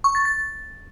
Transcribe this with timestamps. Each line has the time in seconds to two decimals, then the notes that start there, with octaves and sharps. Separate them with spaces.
0.04 C#6
0.15 A6
0.25 A6